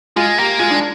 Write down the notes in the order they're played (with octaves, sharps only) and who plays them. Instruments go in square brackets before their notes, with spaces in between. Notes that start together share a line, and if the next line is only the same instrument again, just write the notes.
[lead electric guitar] G#3 [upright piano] F4
[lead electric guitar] A#3 [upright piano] G4
[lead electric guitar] G#3 [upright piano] F4
[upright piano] D4